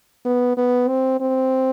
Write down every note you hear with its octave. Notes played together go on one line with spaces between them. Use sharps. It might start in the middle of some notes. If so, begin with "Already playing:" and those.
B3
B3
C4
C4